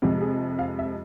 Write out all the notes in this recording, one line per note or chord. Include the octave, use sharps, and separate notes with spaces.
F2 C3 F3 G#3 G4
G#4
F5
E5